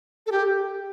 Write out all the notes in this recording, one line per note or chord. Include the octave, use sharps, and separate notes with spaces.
A4
G4